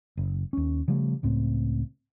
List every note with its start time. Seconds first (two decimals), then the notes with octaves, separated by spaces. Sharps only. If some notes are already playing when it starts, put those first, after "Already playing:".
0.17 F#1
0.53 D#2 C#4
0.88 C#3 F3 G3 A3
1.23 C#2 A2 C4